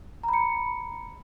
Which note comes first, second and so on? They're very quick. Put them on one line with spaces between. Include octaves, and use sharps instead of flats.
A#5 B5 C#7